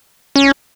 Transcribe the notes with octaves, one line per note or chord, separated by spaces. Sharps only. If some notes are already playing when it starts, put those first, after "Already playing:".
C#4